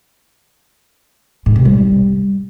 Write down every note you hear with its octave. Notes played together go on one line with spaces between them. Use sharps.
G#2
C3
G3